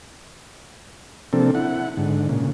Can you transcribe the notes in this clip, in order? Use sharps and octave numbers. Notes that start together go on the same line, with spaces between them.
C3 F3 A#3 C4 D4 A4
E4 F#5
G#2 D3
A#2 C#3